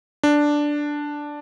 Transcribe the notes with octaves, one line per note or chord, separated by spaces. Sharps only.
D4